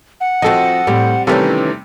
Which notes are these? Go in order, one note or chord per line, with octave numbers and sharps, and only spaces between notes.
F#5
F3 C4 F#4 A4 D#5
A2 G3 C4
C3 D#3 E3 G3 A3 C#4